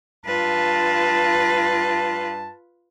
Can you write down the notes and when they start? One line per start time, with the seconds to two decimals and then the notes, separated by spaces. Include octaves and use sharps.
0.26 G2 F4 B4 A5